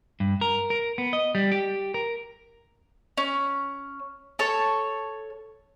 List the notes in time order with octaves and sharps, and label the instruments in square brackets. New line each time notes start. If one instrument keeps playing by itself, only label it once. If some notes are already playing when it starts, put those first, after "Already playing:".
[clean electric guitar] G2
A#4
A#4
B3
D#5
G3
G4
A#4
[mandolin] C#4
A4 C#5